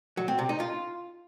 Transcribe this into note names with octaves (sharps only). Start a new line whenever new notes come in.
F#3
C4
C3
D#4
F4